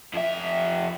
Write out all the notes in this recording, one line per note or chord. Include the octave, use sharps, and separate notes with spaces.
F2 E5